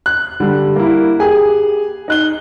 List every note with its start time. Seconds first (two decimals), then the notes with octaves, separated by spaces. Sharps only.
0.06 F#6
0.40 D3 G3
0.76 A#3 E4
1.20 G4 G#4 G#5
2.08 D#4 F#6 G7